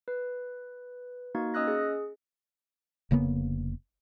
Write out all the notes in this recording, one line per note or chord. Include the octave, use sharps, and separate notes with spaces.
B4
A#3 D#4 F#4 G#6
C#4 D#5 D#6 E6 F#6 A#6
G#4
F1 C#3 A#3 B3